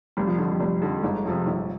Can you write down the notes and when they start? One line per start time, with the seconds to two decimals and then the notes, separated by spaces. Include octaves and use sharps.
0.17 F1 G3
0.27 F3
0.38 F2 D3 F3
0.49 G3
0.60 F1 G3
0.82 F2 D3
1.03 G1 G#3
1.25 F2 C3 F3
1.47 G1